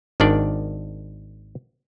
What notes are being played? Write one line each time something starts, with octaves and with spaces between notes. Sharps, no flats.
G#1 D#3 D4 D5